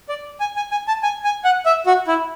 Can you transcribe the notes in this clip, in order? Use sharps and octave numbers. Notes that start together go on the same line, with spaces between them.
D5
G#5
G#5
G#5
A5
G#5
G#5
F#5
E5
F#4
E4